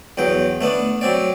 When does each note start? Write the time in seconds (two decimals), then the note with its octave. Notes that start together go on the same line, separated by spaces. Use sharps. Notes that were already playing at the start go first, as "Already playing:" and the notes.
0.18 E2 F#3 G5
0.61 A3 B3 D4
1.01 F#3 C4 D5